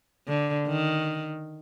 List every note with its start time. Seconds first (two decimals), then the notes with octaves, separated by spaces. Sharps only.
0.28 D3
0.67 D#3